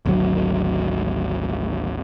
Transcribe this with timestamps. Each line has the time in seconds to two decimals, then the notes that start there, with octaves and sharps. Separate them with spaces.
0.06 G#1 D2 F#3